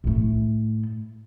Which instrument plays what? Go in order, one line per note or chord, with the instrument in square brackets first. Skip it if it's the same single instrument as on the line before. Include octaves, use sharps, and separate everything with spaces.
[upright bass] A2 A3